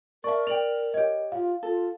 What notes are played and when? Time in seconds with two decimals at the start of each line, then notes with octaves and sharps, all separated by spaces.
0.24 A#4 D5 E5 A5 C#6
0.47 D5 G5 F7 F#7
0.94 G4 C#5 D#5
1.32 F4 F5
1.63 F4 A4